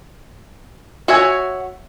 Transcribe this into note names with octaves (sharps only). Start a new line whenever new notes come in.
F#4 C#5 E5 G#5